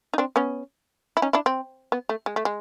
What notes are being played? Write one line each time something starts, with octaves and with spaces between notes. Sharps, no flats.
D#4
C4 D4
B3 C#4
E4
C#4 D#4
D4 E4
C4
B3
A3
G#3
A3
G#3